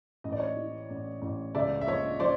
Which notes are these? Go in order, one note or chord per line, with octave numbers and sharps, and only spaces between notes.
A1 D#5
D5
C#5 D#5
E3
A1
A1
C#2 D5 E5
E5
F3 C#5 D#5
F3 C5 D5